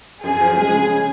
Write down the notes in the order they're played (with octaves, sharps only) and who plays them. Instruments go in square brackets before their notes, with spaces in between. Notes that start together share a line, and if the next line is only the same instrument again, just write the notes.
[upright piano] F#2 [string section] G#4
[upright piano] F3
[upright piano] G#3 [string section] G#4
[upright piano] C#3
C#3